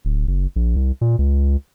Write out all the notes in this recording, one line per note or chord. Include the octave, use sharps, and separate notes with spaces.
D1
F#1
A#1
C2
A#2
C#2